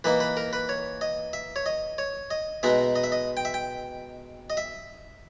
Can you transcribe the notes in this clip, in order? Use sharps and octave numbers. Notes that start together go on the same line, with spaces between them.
E3 A#3 D#4 B4
B4
A#4
B4
C#5
D#5
E5
C#5
D#5
C#5
D#5
B2 G#3 B3 D#4 E5
D#5
E5
D#5
G5
E5
G5
D#5
E5